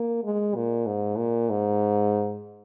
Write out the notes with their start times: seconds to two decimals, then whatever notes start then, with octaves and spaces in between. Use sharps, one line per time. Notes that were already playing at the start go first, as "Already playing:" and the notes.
Already playing: A#3
0.24 G#3
0.55 A#2
0.86 G#2
1.18 A#2
1.50 G#2